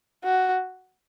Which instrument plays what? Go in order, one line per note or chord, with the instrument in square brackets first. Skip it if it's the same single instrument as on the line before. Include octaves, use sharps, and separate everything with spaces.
[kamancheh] F#4